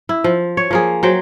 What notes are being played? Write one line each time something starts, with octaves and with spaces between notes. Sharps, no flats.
E4
F3
C#5
F3 A#3 G#4
F#3 C5 G5